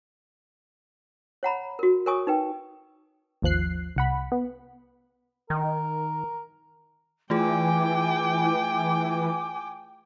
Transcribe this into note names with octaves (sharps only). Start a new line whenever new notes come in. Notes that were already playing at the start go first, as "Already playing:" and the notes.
C#5 F#5 A#5 B5
F#4 A#4
A#4 C#5 G#5 C#6 D#6
D#4 B4 G5
G#1 D#2 F3 F#6 C7
C2 F#5 B5
B3
D#3 A#4
E3 A3 F4 G#4 G5 G#5 D6